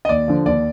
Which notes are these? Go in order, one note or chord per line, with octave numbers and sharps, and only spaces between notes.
D#5
D#2 D5
D3 F3
D#2 D5